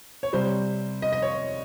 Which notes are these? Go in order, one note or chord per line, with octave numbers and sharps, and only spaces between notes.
C#5
C3 G3 C5
D#5
D#5
C#5